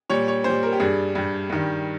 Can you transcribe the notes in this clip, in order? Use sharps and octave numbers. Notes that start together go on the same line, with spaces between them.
A#2 G3 C#5
C#5
A#2 C5
G3
A#4
G4
G2 G3 G#4
G2 G3
G2 D#3 G3